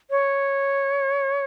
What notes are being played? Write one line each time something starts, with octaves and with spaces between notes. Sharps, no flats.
C#5